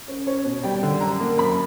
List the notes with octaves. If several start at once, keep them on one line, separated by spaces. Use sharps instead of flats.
C#4
C#4 C#5
B2
G3 G5
D3
F#2 A#5
A#3
F#2 B5